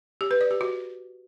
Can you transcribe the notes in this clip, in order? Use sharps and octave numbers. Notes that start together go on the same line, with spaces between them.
G4
B4
D5
G4
F#4